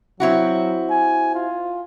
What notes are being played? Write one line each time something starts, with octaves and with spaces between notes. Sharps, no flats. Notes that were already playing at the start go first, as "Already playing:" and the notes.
F#3 C4 E4 F#4
G#5
F4